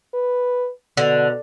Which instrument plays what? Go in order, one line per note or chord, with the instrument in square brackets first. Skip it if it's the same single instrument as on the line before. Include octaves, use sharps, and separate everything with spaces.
[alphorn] B4
[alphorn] B2 [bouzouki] D3